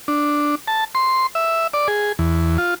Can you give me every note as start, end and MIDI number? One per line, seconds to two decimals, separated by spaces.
0.08 0.55 62
0.68 0.84 81
0.95 1.27 84
1.35 1.67 76
1.74 1.88 74
1.88 2.12 68
2.19 2.58 40
2.58 2.74 65